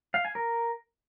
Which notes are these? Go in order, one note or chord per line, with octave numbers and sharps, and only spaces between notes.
F5
G#5
A#4